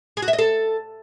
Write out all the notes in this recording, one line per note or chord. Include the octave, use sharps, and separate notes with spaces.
G#4
F#4
E5
D#5
A4